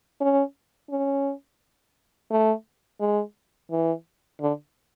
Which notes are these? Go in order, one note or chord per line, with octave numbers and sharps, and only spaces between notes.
C#4
C#4
A3
G#3
E3
D3